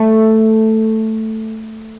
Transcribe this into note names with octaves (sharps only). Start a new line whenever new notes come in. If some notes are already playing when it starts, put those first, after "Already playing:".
Already playing: A3